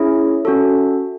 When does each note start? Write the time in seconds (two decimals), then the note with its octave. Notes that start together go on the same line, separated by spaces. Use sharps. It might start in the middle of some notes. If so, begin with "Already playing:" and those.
Already playing: C#4 E4 G#4 C#5 E5
0.45 C#4 F#4 A4